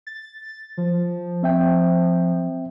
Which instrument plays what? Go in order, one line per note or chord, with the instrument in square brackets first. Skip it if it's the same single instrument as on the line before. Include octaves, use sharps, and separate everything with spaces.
[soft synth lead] A6
F3
[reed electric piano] C4 E5 G5